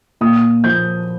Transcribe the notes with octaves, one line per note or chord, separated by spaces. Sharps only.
A#2 D#6
F3 A#3 G6